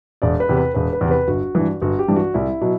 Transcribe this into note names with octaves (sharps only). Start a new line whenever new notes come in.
E1 D5
B4
E2 C3
B4
E1 B4
B4
E2 C3
B4
G1 F#4
G2 E3
G1 F#4
G4
G2 E3
F#4
C2 E4
B2 F#3